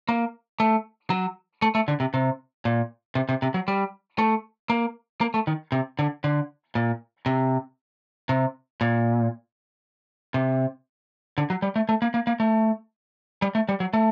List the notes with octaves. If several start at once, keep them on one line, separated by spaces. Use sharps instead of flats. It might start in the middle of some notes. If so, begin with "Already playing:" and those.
A#3
A3
F#3
A3
A3
D3
C3
C3
A#2
C3
C3
C3
F#3
G3
A3
A#3
A#3
A3
D#3
C3
D3
D3
A#2
C3
C3
A#2
C3
D3
F#3
G3
A3
A3
A#3
A#3
A#3
A3
G3
A3
G3
F#3
A3